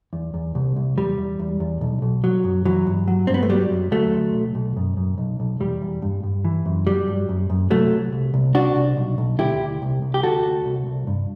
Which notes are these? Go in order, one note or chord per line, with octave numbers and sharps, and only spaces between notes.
E2
E2
C2
C2
E2 G3
E2
E2
E2
B1
B1
F#3
F#2
E3 F#3
G2
F#3
G2 C4
B3
A3
F#3 G3
F#2
D2 F#3 A3
D2
B1
B1
F#2
F#2
B1
B1
E2 G3
E2
G2
G2
E3
F#2
F#3 G3
G2
F#2
F#2
C2 F#3 A3
C2
C2
C2
C2 D4 F#4
C2
B1
B1
D2 E4 G4
D2
C2
C2
G4
D2 F#4 A4
D2
C2
C2
G2